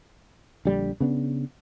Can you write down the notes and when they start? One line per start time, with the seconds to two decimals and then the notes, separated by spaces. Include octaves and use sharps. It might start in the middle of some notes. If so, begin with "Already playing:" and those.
0.65 A#1 D3 G3
1.00 C#3 B3 D4